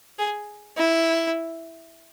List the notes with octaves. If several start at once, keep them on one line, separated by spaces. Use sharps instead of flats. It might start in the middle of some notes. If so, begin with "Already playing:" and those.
G#4
E4